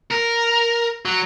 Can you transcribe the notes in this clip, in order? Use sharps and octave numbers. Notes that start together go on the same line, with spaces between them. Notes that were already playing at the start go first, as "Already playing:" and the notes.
A#4
F#3